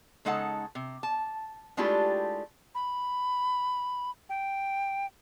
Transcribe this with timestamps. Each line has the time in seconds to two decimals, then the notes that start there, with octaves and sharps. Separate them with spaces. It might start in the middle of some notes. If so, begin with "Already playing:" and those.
0.25 C#3 G#3 D#4 A4 F#5 A5
0.75 C3
1.03 A5
1.77 G#3 A3 D4 E4 F4 G4
2.75 B5
4.29 G5